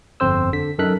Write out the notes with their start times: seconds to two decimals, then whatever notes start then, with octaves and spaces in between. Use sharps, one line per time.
0.20 G1 F2 C4 C5 E6
0.53 D3 B6
0.78 F#2 D#4 A4 A#4 F#6 B6